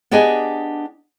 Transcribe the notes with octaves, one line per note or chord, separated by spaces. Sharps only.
B3 D4 G4 G#4 D#5 G#5